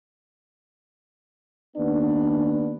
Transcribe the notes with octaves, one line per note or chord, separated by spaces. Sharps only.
D#2 B3 D4